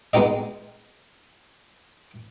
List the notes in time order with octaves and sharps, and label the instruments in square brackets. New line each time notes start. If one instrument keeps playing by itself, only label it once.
[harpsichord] G#3 B3 D#4 G4 D#5